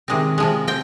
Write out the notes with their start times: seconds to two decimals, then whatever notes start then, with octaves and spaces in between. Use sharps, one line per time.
0.08 C3 D#3 G#3 C4
0.38 C3 F3 G#3
0.67 C4 G5